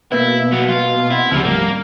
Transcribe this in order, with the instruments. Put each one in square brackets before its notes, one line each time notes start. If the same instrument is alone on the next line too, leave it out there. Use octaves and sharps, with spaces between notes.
[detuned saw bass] B2 [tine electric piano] A#3 B4 [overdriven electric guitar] E4
[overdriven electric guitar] F#3 B3
F4
[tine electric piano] C4 F#5 [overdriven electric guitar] E4
[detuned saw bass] D2 [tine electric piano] C#3 [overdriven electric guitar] F3 G3
[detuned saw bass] F1 [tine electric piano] G#2 G3 [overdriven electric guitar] A#3